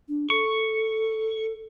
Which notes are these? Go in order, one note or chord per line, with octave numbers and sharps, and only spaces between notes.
D4
A4 C#6